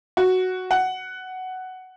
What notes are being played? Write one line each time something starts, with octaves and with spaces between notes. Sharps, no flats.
F#4
F#5